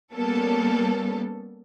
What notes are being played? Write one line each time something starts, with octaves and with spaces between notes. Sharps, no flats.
G3 A#3 B3 C#4 A4